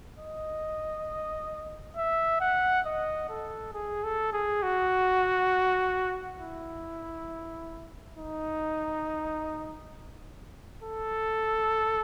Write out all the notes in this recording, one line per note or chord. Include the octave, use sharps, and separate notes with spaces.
D#5
E5
F#5
D#5
A4
G#4
A4
G#4
F#4
E4
D#4
A4